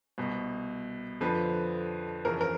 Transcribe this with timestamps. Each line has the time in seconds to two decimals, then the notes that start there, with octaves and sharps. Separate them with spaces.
0.18 C2 B2
1.21 F2 D3 F3 B4
2.25 F2 C#3 E3 A#4
2.41 A#4